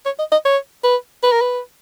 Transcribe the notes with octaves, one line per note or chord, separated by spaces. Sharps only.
C#5
D#5
D#5
C#5
B4
B4
A#4
B4